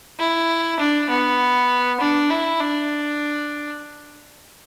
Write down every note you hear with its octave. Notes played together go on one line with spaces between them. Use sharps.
E4
D4
B3
D4
E4
D4